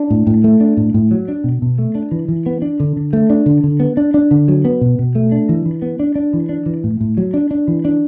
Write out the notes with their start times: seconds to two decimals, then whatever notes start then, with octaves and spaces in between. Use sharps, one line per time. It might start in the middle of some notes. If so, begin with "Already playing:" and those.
Already playing: D4
0.10 A2
0.27 A2
0.44 A3
0.60 D4
0.77 A2
0.94 A2
1.11 F#3
1.28 D4
1.44 B2
1.62 B2
1.79 A3
1.95 D4
2.11 E3
2.28 E3
2.46 B3
2.62 D4
2.80 D3
2.96 D3
3.13 A3
3.30 D4
3.46 D3
3.64 D3
3.80 B3
3.97 D4
4.14 D4
4.31 D3
4.48 F#3
4.65 B3
4.81 B2
4.99 B2
5.15 A3
5.32 D4
5.49 E3
5.66 E3
5.82 B3
6.00 D4
6.15 D4
6.33 E3
6.49 D4
6.66 E3
6.84 A2
7.00 A2
7.17 F#3
7.34 D4
7.51 D4
7.68 E3
7.85 D4